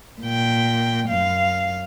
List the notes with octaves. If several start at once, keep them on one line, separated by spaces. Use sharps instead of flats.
A#2 G5
F#2 F5